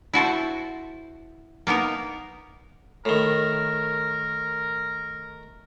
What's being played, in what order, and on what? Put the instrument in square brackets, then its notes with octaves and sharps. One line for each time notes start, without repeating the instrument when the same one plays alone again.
[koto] E4 F#4 A4 C5
A#3 B3 D#4 A#4
[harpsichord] A2 D#3 [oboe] A#4